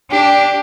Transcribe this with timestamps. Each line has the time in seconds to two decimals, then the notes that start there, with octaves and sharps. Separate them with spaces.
0.11 D4 G4